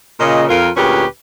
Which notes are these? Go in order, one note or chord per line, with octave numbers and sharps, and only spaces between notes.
A#2 C#3 D#5
F2 F4 A#4
D2 A#2 C#4 G4 G#4 B4